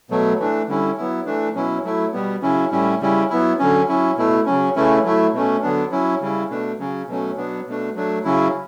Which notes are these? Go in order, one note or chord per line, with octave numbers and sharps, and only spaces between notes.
B2 F#3 A3
E3 A3 D4
D3 G3 C#4 E4
F#3 B3 E4
E3 A3 D4
B2 F#3 C#4 E4
F#3 A3 E4
B2 G3 B3
C#3 F#3 C#4 E4
A2 G3 C#4 E4
C#3 G3 C#4 E4
F#3 B3 E4
D3 F#3 C#4
F#3 C#4 E4
B2 A3 E4
C#3 F#3 C#4
C#3 E3 A3 C#4 E4
F#3 A3 E4
B2 A3 C#4
D3 F#3 B3 D4
F#3 C#4 E4
C#3 G3 C#4 E4
B2 A3 D4
C#3 F#3 C#4
B2 F#3 A3 C#4
B2 F#3 B3 D4
B2 A3 D4
F#3 A3 D4
C#3 F#3 C#4 E4